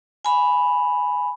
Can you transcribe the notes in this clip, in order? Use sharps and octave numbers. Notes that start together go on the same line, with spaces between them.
G#5 B5